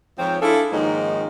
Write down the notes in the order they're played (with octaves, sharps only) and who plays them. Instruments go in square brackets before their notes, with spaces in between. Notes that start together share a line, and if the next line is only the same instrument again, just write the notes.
[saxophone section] F2 G#2 F3 C4 C5 C#5
D4 E4 F4 G#4 A4
G#2 D#3 F3 G#3 A#3 C#4